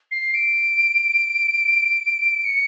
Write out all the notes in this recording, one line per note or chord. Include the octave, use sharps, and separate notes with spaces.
C7
D7
C#7